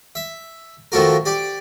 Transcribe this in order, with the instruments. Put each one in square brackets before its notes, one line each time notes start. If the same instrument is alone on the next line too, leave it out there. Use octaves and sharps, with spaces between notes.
[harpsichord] E5
D#3 F3 A3 F#4 A#4
G4 D5